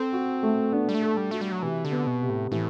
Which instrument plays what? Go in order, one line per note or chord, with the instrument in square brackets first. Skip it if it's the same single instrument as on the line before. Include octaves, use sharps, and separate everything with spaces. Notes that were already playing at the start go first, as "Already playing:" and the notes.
Already playing: [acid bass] C4 [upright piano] A4
[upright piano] F#4
A3
[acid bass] B3 [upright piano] D4
[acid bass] G3
A3
[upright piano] A4
[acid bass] G3
[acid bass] A3 [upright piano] F#4
[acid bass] G3
F#3
[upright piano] C3 [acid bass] E3
[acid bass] D3
[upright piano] B3
[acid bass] B2
[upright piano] C3
[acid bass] A2
[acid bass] A2 [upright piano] E3